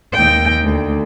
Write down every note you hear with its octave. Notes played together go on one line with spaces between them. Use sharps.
D#2 G5
D2